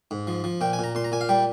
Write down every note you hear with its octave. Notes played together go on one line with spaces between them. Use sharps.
G#2
F3
F3
A#2 G5
G#5
A#2 A#5
A#2 C6
A#5
A#2 G#5
F5
G3 G5